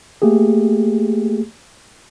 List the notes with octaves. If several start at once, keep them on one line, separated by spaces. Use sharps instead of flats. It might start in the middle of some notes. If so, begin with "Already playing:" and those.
A3 A#3 G4 G#4